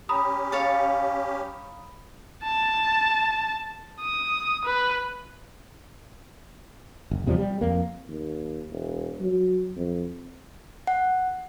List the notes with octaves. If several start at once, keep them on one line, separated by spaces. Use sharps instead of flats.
C#4 G4 A#5 B5 D#6
C#5 F5 A5
A5
D#6
B4
F#1
E2 C3 F3 G3
G3
F2 A#3
D#2
E1
F#3
F2
F#5